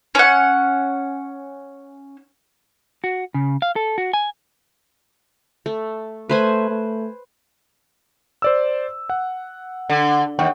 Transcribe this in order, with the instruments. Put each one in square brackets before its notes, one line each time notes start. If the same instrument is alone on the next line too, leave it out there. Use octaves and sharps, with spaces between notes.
[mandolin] C#4 F#5
[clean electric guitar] F#4
C#3
F5
A4
F#4
G#5
[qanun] A3
[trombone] A3 [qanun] B4 C5 G#5
[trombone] A3
[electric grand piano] C5 D5 E6
F#5
[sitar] D3
[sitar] D#2 [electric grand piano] F#5 G5 C#6